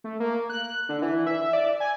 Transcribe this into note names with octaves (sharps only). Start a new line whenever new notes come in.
A3
A#3
F#6
D3
E3
E5
D5
G#5